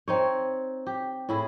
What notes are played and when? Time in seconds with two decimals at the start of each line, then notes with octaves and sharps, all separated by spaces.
0.08 C4 D#4 C#5
0.87 G4
1.29 A2 E4 G#4